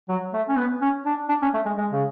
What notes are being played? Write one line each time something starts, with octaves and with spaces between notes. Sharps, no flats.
F#3
A3
C#4
B3
C#4
D4
D4
C#4
A3
G#3
G#3
C#3